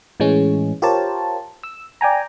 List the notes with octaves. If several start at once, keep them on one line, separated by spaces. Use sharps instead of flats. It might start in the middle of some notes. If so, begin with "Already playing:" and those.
A2 E3 G#3 C#4
F4 G4 A#4 C5 C#5 A5
E6
D5 G5 G#5 A#5